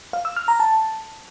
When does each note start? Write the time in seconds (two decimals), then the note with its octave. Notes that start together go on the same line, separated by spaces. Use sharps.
0.13 F5
0.25 E6
0.36 F6
0.48 A#5
0.60 A5